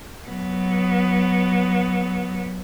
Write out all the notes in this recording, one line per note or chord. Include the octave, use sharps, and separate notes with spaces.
F#3 B3